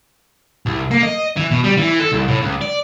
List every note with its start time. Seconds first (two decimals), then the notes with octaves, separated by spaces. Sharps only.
0.66 C2
0.91 A#3
1.03 D#5
1.37 E3
1.51 B2
1.64 G3
1.77 E3
2.00 A4
2.12 C2
2.28 A2
2.42 C#2
2.61 D5